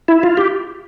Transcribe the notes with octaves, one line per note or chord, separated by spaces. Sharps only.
E4
F4
G4